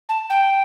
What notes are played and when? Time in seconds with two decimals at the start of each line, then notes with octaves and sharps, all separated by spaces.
0.09 A5
0.30 G5